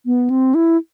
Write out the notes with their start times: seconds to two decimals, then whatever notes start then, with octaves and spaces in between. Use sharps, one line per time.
0.06 B3
0.30 C4
0.55 E4